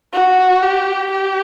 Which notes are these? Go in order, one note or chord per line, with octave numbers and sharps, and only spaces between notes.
F#4
G4
G4